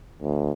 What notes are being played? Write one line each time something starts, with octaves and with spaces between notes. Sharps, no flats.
D2